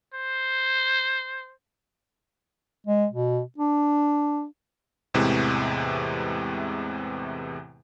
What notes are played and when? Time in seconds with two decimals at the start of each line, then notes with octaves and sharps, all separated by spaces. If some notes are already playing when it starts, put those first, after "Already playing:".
0.14 C5
2.86 G#3
3.11 B2
3.58 D4
5.14 E2 A2 C3 E3 G#3